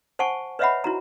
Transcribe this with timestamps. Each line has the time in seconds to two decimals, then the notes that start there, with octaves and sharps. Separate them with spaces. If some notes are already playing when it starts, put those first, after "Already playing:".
0.19 C5 F#5 G#5 A5 C#6
0.59 B4 C#5 D#5 E5 F#5 B5
0.84 E4 F#4 A#5